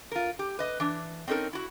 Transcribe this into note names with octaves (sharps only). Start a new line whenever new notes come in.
F4 A#4
G4
B4 D#5
E3 D4
C4 C#4 D#4 A4 A#4
E4 F#4